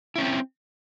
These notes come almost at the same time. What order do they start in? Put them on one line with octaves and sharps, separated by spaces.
E4 C#4 C4